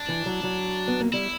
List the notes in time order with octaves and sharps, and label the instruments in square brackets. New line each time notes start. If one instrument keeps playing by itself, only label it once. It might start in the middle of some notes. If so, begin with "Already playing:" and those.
Already playing: [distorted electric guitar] D4
[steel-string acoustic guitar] E3
F#3
F#3
B3
A#3
[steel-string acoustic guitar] G3 [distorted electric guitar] E4